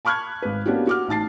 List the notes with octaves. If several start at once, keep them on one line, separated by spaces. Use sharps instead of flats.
A5 B5 C#6 F6 F#6 G#6
G#1 B4
A#3 B3 C#4 D4 F#4 G4
F#4 D6 F6
A1 D#4 A5 A6 C7